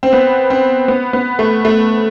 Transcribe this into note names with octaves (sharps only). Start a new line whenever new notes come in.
C4
B3
C4
B3
B3
A3
A3